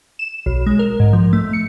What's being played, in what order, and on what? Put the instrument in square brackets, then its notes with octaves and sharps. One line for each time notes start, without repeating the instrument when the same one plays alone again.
[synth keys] E7
B1
G#3
A#4
G#2
F3
A3
C#7